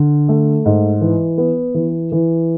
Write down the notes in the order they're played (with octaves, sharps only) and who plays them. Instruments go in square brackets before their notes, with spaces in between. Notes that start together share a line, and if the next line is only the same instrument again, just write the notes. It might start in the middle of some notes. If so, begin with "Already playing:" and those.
Already playing: [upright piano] D3
A3
G#2
E3
B3
E3
E3